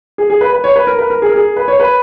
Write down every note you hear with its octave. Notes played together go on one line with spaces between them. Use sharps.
G#4
G#4
B4
B4
C#5
B4
A#4
B4
A#4
G#4
A#4
G#4
B4
C#5
B4